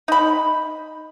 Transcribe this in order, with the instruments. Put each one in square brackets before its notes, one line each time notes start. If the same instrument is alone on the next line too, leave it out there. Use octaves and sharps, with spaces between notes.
[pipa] D#4 B5